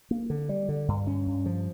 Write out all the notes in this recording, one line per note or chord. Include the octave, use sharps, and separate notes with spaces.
A#3
D3
G3
D3
G2
C#4
G2
F3